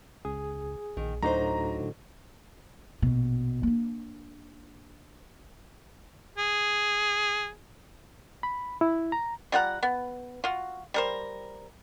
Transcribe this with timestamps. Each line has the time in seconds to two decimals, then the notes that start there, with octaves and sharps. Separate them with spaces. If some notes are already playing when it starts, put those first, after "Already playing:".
0.25 C#2 G#4
0.97 A#1 D#3
1.23 D2 A2 D3 F#3 D#4 C5 A#5
3.02 A#1 B2
3.63 A#3 D4
6.38 G#4
8.43 B5
8.81 E4
9.12 A#5
9.52 G3 F4 F#5 A#5
9.83 B3
10.44 F4 F#4
10.94 G3 A#4 C5